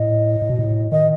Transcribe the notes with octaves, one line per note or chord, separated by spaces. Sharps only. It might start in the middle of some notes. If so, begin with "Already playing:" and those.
Already playing: A2 D#5
A2
B2
A2
D#3 D#5